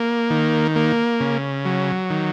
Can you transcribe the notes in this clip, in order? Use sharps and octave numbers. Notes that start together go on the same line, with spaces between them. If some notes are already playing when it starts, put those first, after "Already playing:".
Already playing: A#3
D#3
A#3
C#3
F#3
D#3